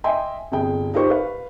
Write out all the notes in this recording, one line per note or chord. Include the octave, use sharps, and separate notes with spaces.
D#5 E5 G5 G#5 C6
G1 C3 G#4 G5
D#4 F4 G4 A#4 C5 C#6
B4 F5